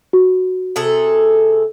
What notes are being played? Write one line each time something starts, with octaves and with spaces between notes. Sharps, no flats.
F#4
C3 G#4 A4